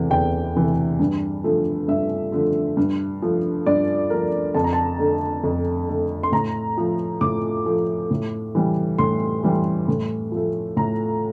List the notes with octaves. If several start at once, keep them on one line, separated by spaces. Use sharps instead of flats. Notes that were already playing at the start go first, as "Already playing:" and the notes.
Already playing: E2 C3 E3 A3
E2 G5
C3 E3 A3
G2
D3 F3 A3
G2 E5
D3 F3 A3
G2
F3 A3
G2 D5
F3 A3 A#4
F2 A5
A#5
A5
D3 A3
F2
D3 A3
C6
A2 A#5
F3 A3
A2 D6
F3 A3
A2
E3 G3
A2 C6
E3 G3
A2
F3 A3
A2 A#5